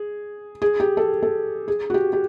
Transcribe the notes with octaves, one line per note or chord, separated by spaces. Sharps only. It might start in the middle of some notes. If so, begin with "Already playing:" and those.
Already playing: G#4
G#4
G4
A4
A4
G#4
F#4
G4
G4